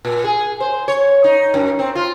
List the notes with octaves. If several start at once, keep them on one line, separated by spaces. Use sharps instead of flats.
A#2
G#4
C5
C#5
D#4
F#2
C4
F4